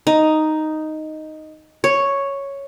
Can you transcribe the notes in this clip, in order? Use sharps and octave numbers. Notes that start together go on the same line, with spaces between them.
D#4
C#5